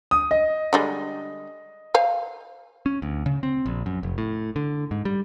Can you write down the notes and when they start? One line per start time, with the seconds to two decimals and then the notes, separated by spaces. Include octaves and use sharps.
0.11 D#6
0.31 D#5
0.73 D3 G3 G#3
1.94 C5 F5 G#5
2.86 C#4
3.02 D2
3.26 C#3
3.43 C4
3.66 A#1
3.86 F#2
4.03 F1
4.18 A2
4.56 D3
4.91 G#2
5.05 G3